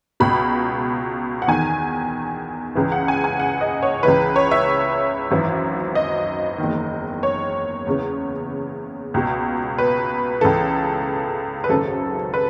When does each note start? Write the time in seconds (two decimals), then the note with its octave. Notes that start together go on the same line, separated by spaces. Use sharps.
0.20 C#2 B2 B5
1.42 F#5
1.48 E2 D#3 G#5
2.75 C#2 C#3 E3
2.92 F#5
3.08 G#5
3.24 G#5
3.39 F#5
3.61 D#5
3.83 C#5
4.03 C#2 C#3 E3 B4
4.36 C#5
4.51 E5
5.31 G#1 F#2 E3
5.95 D#5
6.58 F#1 E2 D#3
7.23 C#5
7.87 E2 C#3 E3
9.14 C#2 B2
9.78 B4
10.41 C#2 C#3 E3 A4
11.64 B4
11.69 G#1 F#2 C#3 A4
12.34 B4